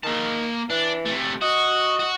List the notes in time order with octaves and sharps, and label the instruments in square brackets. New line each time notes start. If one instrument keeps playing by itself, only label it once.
[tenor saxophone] D#3 [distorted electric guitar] A#3 A5
[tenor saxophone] E3 [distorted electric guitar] D4
[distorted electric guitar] C3 A3
[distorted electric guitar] F#4 [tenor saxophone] D#5
[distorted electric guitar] F#4